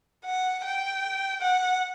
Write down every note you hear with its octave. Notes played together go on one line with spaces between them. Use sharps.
F#5
G5
F#5